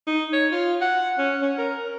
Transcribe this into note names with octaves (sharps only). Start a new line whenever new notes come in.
D#4
C#5
F4
F#5
C#4
C#4
A#4